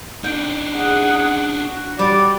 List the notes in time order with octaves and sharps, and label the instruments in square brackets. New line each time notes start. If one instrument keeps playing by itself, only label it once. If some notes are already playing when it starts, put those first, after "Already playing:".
[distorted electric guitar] D4 D#4 [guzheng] G5
[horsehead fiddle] G#4 F#5
F#4
[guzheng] G3 [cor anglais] D5